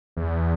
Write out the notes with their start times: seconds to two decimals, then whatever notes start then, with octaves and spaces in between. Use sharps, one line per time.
0.17 E2